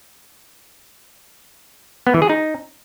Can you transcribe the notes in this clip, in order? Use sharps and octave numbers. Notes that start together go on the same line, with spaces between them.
B3
E3
G#4
D#4